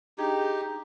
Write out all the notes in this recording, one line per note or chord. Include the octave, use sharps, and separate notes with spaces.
D4 D#4 G4 G#4 G5